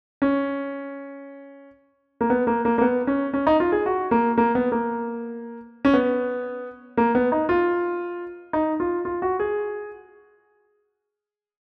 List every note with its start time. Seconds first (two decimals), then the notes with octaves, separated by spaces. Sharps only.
0.22 C#4
2.21 A#3
2.30 B3
2.47 A#3
2.65 A#3
2.78 A#3
2.82 B3
3.07 C#4
3.34 C#4
3.47 D#4
3.60 F4
3.72 G#4
3.86 F#4
4.11 A#3
4.38 A#3
4.55 B3
4.72 A#3
5.85 C#4
5.94 B3
6.97 A#3
7.15 B3
7.32 D#4
7.49 F4
8.53 D#4
8.80 F4
9.05 F4
9.22 F#4
9.40 G#4